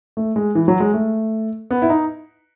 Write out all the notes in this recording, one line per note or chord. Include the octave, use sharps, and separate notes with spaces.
A3
G#3
E3
F#3
G#3
A3
B3
E4
D#4